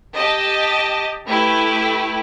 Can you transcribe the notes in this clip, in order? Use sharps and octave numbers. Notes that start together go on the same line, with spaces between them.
G4 D#5 A5
A3 E4 G4 B4